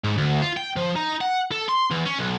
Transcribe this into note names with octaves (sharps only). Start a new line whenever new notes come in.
G#2
D2
F4
G5
F3
D#4
F#5
A4
C6
E2
C#4
B1